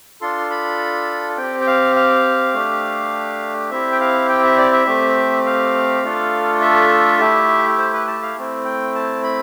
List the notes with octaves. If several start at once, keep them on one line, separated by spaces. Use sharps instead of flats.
D4 F4 A4 C6
B5
C4 G4 G5
G5
F5
F5
A3 D4 G4
C4 E4 G4 E5
G5
F5
G5
E5
D5
E5
A3 C4 G4
F5
A3 D4 F4 A4
E5
A3 E4 G4
C5
B4
A5
F5
A3 C4 E4
G5
A5
B5